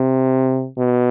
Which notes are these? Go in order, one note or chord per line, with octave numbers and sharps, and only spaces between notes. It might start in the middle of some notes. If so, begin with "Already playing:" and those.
Already playing: C3
B2